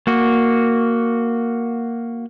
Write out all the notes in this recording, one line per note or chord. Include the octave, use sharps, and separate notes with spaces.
A#3 F#4